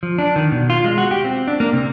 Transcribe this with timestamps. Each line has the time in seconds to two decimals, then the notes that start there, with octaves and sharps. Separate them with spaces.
0.03 F3
0.18 D4
0.36 D#3
0.52 B2
0.70 F4
0.84 G#3
0.98 F#4
1.11 G4
1.24 C4
1.48 D4
1.60 A#3
1.73 C3